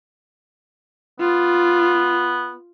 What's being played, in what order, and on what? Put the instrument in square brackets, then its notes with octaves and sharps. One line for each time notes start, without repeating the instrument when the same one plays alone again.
[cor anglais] B3 [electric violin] F4